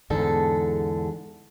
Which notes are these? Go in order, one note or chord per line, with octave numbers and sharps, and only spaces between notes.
E2 G#2 D3 A4